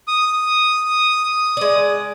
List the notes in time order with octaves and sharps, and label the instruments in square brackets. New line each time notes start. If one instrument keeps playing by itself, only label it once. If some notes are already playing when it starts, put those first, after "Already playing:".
[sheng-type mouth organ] D#6
[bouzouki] G#3 D5